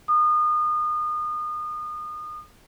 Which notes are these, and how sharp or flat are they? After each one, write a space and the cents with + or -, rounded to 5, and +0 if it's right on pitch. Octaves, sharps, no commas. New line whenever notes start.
D#6 -30